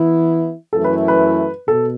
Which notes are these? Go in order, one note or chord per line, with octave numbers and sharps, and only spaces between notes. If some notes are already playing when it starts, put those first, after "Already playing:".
Already playing: E3 B3 E4
F#2 E3 A3 E4 A4
B4
B4
B2 A4